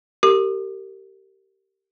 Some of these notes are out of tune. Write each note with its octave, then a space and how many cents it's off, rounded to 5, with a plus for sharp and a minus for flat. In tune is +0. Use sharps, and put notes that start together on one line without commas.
G4 -20 A#4 -35 D6 +45